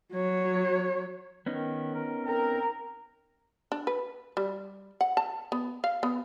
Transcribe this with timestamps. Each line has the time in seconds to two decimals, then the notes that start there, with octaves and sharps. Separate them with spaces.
0.13 F#3 C#5
1.46 D#3 B3 C#4 D#4
1.95 A#4
2.26 C4 A#4
3.72 D4
3.87 B4
4.37 G3
5.01 F#5
5.17 A5
5.52 B3
5.84 F5
6.03 B3